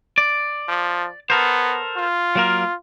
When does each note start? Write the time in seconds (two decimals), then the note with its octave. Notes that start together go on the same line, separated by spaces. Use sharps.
0.18 D5
0.68 F3
1.30 B3 A4 A#4 C5
1.97 F4
2.35 F#3 A#3 A#4